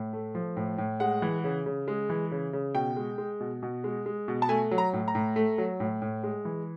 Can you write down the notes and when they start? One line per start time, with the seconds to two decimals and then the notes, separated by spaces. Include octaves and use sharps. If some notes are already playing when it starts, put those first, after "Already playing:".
Already playing: A2
0.13 A3
0.35 F3
0.56 A2
0.78 A2
1.00 G#3 F#5
1.22 E3
1.44 C#3
1.66 C#3
1.88 G#3
2.09 E3
2.32 C#3
2.53 C#3
2.75 B2 G5
2.96 G#3
3.18 G#3
3.40 B2
3.63 B2
3.84 G#3
4.06 G#3
4.28 B2
4.42 A5
4.49 A3 G#5
4.71 F#3
4.78 A#5
4.93 A2
5.08 A#5
5.15 A2
5.36 A3
5.58 F#3
5.80 A2
6.02 A2
6.24 G#3
6.45 E3